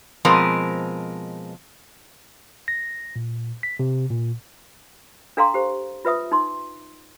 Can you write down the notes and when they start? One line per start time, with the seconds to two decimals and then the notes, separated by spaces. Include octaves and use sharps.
0.25 B2 F3 G#3 C4 A#4
2.68 A#6
3.16 A#2
3.63 B6
3.80 C3
4.10 A#2
5.37 D4 A4 F5 A#5 C6
5.54 G4 C5
6.05 F4 B4 E5 D#6
6.32 D#4 C6